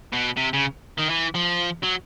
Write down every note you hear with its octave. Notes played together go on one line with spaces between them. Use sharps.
B2
C3
C#3
D#3
E3
F3
F#3